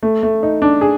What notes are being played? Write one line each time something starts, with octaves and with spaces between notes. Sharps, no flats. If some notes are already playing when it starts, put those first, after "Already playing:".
A3
A3
D#4
D4
G#4